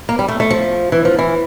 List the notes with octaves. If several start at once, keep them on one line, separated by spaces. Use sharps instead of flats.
A#3
G3
A3
A3
F3
E3
F3
E3